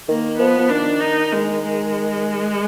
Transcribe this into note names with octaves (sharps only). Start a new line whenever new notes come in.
D#3 A#3
F3 B3
F3
D#3 D4
D#4
G#3
G#3